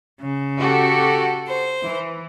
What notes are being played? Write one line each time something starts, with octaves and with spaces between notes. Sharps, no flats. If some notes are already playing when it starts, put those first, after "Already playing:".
C#3
F#4 G4 A4
C5
E3